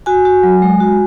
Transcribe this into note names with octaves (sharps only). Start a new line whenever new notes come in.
F#4 G#5
F#4
F#3
G#3
F#4